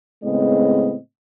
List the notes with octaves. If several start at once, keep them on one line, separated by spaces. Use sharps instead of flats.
A2 C#3 G#3 B3 C4 D#5